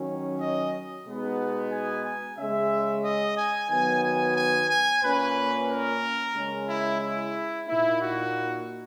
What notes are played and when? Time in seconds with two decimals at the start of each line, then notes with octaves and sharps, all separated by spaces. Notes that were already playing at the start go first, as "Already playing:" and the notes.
Already playing: D#3 F#3 C#4
0.40 D#5
1.06 B2 G#3 B3 D#4
1.72 G#5
2.05 G#5
2.38 C#3 G#3 C#4 E5
3.04 D#5
3.38 G#5
3.70 D#3 F#3 B3 G#5
4.03 G#5
4.36 G#5
4.69 G#5
5.02 A#2 A#3 C#4 B4
5.69 A#4
6.35 C#3 G#3 C#4
6.68 E4
7.01 E4
7.67 A#2 A#3 D#4 E4
8.00 F#4